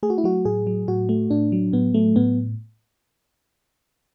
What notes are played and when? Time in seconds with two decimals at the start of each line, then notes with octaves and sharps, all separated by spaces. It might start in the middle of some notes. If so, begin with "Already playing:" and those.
0.03 A3 G#4
0.10 F#4
0.18 E4
0.24 F#3 F#4
0.45 A2 G#4
0.67 F#3
0.88 A2 F#4
1.09 A3
1.31 A2 D4
1.52 F#3
1.73 A2 B3
1.94 F#3 A3
2.16 A2 B3